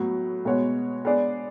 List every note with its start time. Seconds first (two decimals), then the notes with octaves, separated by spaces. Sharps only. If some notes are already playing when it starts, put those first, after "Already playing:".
Already playing: A2 F#3 B3
0.45 B2 G#3 B3 F#4 C#5
1.05 G#3 B3 D4 G#4 D5